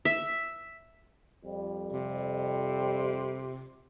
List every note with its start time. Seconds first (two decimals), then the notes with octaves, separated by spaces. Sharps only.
0.05 E5
1.45 F2 G3
1.92 C3